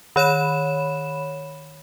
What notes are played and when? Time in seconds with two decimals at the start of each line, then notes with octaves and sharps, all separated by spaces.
0.16 D#3 C#5 B5 E7